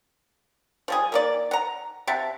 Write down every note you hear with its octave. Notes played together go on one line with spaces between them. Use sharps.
F3 G3 G#4
A#3 D#4 D5
F#5 A#5
C3 E5 F#5 A5